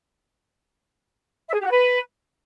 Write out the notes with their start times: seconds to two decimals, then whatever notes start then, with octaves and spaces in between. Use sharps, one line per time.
1.48 E5
1.53 G#4
1.59 G4
1.64 F#4
1.70 B4